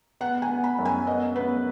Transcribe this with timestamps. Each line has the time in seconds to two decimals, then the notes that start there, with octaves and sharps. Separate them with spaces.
0.21 B3 F#5
0.42 G#5
0.50 B3
0.64 B5
0.79 F#2
0.85 G#5
1.07 B3 D#5
1.36 B3 B4